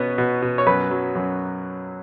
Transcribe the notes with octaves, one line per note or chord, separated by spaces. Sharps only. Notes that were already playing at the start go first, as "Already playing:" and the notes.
Already playing: B2 B3 C#4
B2
B2
C#5
F#2 B4
F#3
F#2